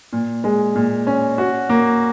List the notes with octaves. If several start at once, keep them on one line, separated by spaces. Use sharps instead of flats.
A#2
G#3
A#2
C#4
F#4
A#3